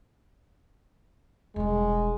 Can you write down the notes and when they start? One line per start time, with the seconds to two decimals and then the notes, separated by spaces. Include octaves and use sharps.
1.56 E1 G3 G#3